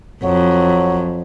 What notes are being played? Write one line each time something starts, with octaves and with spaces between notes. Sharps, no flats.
F2 F#3